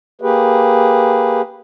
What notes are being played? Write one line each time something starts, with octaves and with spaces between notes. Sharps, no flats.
A#3 G4 G#4 B4